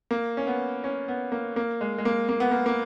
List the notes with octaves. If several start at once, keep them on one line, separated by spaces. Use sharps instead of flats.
A#3
C#4
B3
C#4
B3
A#3
A#3
G#3
G#3
A#3
A#3
B3
A#3
A#3